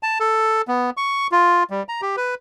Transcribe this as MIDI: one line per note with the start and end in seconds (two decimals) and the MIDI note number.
0.03 0.18 81
0.20 0.62 69
0.68 0.90 59
0.97 1.27 85
1.32 1.63 65
1.70 1.83 55
1.89 2.01 82
2.02 2.16 67
2.17 2.35 71